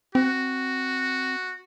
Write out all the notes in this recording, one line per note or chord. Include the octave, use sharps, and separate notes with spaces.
C4 F#4